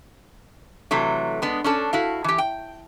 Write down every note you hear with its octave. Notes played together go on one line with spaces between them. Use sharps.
C3 E3 F#3 A3
G#3 B3 D4
C#4 D4 A4
E4 F#4 F5
E3 G4
G5